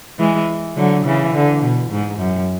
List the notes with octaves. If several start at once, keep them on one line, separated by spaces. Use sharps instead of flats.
E3 G#3
D3 F#3
C#3 E3
D3
B2
G#2
F#2